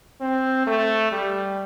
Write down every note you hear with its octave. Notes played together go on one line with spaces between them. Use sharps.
C4
A3
G3